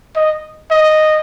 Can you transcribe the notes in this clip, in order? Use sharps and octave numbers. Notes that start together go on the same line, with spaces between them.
D#5
D#5